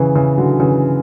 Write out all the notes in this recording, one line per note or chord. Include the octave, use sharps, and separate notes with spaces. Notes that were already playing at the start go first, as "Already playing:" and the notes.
Already playing: C#3 E3
C#3 E3
D3 F#3
C#3 E3